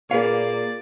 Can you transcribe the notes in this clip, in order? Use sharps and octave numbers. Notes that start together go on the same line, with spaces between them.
A#2 A#3 G#4 B4 D5 F5